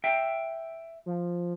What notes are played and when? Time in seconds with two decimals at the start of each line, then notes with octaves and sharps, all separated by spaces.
0.04 E5 G5
1.06 F3